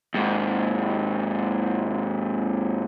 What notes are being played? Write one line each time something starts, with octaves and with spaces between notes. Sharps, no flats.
D#2 G#2